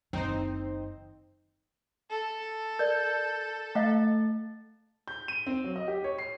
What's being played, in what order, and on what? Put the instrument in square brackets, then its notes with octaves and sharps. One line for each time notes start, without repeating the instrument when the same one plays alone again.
[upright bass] F#1 D#3 [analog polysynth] C4 D#4 C5
[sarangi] A4
[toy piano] A#4 D5 [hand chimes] G6
[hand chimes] A3 A6 [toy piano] D#5 F5 F#5
[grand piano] G6
D#7
C4
F#3
D#5
G4
C#5
C7